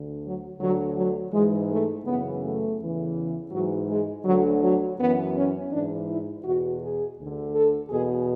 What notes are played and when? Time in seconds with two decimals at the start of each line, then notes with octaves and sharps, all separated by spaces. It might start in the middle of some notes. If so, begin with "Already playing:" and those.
Already playing: D2 D3
0.23 F#3
0.59 D2 D3 F#3
0.96 F#3
1.32 G#2 E3 G#3
1.69 A3
2.05 F#2 C#3 E3 B3
2.42 A3
2.79 E2 C#3 E3
3.52 G#2 E3 F#3
3.88 G#3
4.25 D2 D3 F#3
4.61 F#3
4.97 F#2 E3 B3
5.34 C#4
5.71 G#2 E3 D4
6.07 E4
6.44 E2 B2 F#4
6.80 G#4
7.17 D2 D3
7.53 A4
7.90 E2 B2 G#4